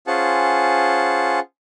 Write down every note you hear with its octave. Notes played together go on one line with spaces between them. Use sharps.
C#4 F4 G#4 C5 F#5 A5